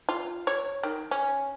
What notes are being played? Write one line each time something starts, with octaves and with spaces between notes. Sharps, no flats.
F4
C#5
D#3
C#4